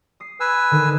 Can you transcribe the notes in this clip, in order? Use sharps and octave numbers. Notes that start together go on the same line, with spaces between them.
D#6 C7
B4 G#5 E6
D3 D#3 D#4